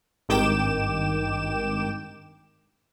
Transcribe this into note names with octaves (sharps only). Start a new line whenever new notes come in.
G#1 G2 D#3 G5 D6 E7